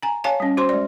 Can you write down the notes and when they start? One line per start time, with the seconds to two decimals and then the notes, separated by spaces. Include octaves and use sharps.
0.02 G#5 A#5
0.24 C#5 F5 G#5 A5
0.40 G3 C#4
0.57 F#4 C5 C6
0.69 G#3 D5